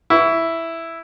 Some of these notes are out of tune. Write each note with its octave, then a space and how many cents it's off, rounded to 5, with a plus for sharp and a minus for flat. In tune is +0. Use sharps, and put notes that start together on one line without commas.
E4 +0 F#5 +25 C#6 +30